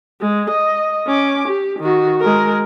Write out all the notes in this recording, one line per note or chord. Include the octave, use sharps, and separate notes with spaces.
G#3
D#5
C#4 D6
G4
D#3 F#4
G#3 A#4